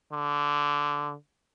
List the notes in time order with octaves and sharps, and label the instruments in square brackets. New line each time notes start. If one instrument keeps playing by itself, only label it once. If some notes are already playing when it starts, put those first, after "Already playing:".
[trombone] D3